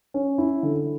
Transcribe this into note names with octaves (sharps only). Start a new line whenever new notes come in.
C#4
E4
D3